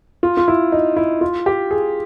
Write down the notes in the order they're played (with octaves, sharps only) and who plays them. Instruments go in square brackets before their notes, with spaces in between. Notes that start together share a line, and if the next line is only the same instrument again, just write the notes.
[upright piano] F4
F4
E4
D#4
E4
F4
G4
G#4